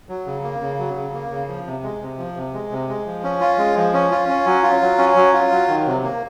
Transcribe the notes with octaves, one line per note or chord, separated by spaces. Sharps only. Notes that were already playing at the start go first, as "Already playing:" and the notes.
F#3
C#3
A#3
C#3
F#3
C#3
A#3
C#3
F3
C3
G#3
C3
F3
C3
G#3
C3
G#3
F3
C#4
F4
G#3
F3
C#4
F4
C#4
F#3
F4
F#3
C#4
F#3
F4
F#3
D#3
C3
A#3